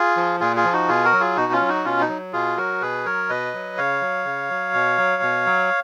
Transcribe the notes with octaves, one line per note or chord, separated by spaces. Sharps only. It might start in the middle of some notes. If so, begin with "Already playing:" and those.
Already playing: F4 G#4
F3
A#2 F4 G#4
F4 G#4
F3
D#4 F#4
B2 F4 G#4
F#4 A#4
F#3
F4 G#4
B2 D#4 F#4
C#4 F4
F#3
D#4 F#4
B2 C#4 F4
D#4
F#3
B2 F4 G#4
F#3 F#4 A#4
B2 G#4 B4
F#3 A#4 C#5
B2 B4 D#5
F#3
C#3 C#5 F5
F#3
C#3
F#3
B2
F#3
B2
F#3